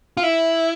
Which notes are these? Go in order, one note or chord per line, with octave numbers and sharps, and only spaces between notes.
F4
E4